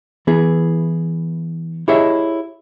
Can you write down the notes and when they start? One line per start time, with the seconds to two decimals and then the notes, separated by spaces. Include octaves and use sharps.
0.27 E3 B3 E4 G#4
1.88 E4 G4 G#4 C#5 D#5 E5